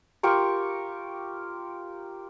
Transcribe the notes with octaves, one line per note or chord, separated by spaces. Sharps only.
F4 G4 A#4 C#6